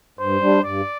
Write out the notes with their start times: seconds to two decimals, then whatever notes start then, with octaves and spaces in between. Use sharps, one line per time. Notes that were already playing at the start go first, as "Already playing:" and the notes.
0.19 G2 C5
0.41 G3 D4
0.63 G2 D5